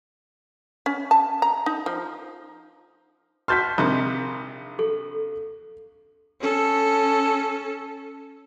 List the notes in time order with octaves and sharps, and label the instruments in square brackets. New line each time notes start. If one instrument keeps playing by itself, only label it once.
[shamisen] C#4
A5
A#5
D#4
F3
[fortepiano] F#4 A5 F6 [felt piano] C6 G6 B6
[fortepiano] A#1 C3 D#3
[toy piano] A4 C#6
[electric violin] C#4 A4